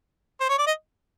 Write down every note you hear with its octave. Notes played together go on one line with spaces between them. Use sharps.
C5
C#5
D5
D#5